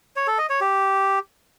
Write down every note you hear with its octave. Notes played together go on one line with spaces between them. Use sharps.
C#5
A4
D#5
C#5
G4